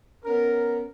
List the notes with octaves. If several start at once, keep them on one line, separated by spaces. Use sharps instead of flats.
B3 C#4 A#4